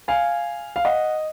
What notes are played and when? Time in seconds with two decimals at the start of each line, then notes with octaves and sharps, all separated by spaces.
0.08 F5 G#5
0.76 F5
0.85 D#5 F#5